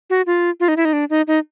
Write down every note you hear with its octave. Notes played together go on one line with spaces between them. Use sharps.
F#4
F4
F4
D#4
E4
D#4
D4
D#4
D#4